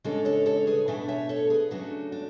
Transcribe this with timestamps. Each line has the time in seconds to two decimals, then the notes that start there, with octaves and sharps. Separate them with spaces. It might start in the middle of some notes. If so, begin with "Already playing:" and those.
0.04 C#3 G#3 D4 A4 C#5
0.25 A4 C#5
0.46 A4 C#5
0.67 G#4 B4
0.88 B2 A3 D4 E5 G#5
1.08 C#5 E5
1.29 A4 C#5
1.50 G#4 B4
1.71 C#3 F#3 A3 D4 F#4
2.12 D4